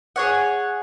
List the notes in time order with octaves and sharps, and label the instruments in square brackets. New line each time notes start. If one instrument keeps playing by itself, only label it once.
[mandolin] G#4 C#5 F#5